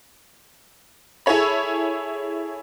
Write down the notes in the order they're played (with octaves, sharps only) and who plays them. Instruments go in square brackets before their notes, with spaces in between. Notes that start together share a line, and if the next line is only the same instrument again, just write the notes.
[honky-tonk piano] E4 G#4 A4 C#5 B5